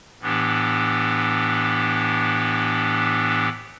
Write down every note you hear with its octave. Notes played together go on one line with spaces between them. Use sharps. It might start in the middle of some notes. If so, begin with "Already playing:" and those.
A2 E3 B3 D4 G4